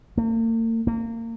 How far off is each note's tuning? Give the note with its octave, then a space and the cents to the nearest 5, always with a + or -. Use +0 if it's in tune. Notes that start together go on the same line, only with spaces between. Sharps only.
A#3 -45
A#3 -30